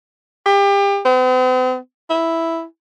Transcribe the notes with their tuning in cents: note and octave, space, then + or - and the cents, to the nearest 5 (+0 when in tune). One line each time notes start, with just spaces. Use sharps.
G4 +30
C4 -45
E4 +0